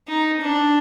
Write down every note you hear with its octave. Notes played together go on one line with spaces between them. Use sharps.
D#4
D4